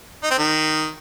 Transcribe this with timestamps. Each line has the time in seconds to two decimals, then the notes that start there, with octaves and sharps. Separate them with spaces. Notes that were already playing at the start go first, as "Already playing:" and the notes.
0.23 D#4
0.31 C4
0.38 D#3